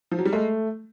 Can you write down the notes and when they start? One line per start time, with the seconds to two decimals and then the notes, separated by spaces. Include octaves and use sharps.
0.11 F3
0.18 F#3
0.26 G3
0.33 G#3 A3